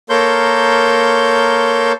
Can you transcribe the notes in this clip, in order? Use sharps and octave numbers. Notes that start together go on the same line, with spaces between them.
A#3 A4 A#4 C#5 C6 G6